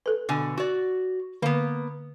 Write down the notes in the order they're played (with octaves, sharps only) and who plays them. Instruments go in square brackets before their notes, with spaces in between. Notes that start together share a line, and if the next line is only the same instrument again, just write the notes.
[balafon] A4 B4
[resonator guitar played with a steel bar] B2 D3 G#5
F#4 D5
[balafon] D3 [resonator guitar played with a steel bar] A#3 B3